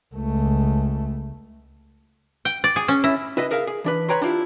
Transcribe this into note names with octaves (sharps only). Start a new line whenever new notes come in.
C#2 A3
G5
D5
G#4
C#4
E4
E4 B4 D#5 E5
G#4 A#4 E5 F5
G#4
E3 D4 B4
B4 C#5 G5 A#5 C6
D4 E4 F4 G4